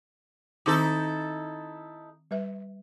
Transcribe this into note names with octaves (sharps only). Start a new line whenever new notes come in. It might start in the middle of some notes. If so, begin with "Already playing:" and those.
D#3 C4 D#4 E4 A4 D6
G3 B4 E5